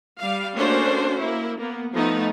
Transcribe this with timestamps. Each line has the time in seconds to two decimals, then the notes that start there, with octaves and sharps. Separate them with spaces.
0.19 G3 F5
0.56 A3 A#3 C#4 D4 F#4 C5
1.19 A#3 E4
1.58 A#3 B3
1.93 F3 A3 B3 D#4